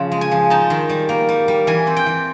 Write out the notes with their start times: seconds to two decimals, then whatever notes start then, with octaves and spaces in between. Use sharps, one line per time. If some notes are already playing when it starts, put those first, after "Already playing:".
Already playing: C#3 F3
0.12 G#3
0.21 G#5
0.31 F3
0.50 D#4 A5
0.70 D#3
0.89 G3
1.09 A#3
1.29 G3
1.48 G3
1.67 E3 G#5
1.87 C4
1.96 G5
2.06 E3